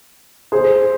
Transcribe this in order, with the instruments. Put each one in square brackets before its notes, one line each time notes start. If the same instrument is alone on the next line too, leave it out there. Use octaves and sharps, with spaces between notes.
[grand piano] G#4 C5